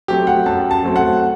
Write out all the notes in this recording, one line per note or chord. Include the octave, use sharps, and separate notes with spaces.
F#3 A3 C4 G4
F#5
F#2 A5
A5
F#3 A3 C4
F#5